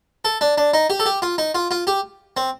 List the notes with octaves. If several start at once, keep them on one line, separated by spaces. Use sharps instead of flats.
A4
D4
D4
D#4
G4
A4
G4
F4
D#4
F4
F4
G4
C4